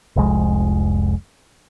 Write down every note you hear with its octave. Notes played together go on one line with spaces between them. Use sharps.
F1 C2 F2 G#3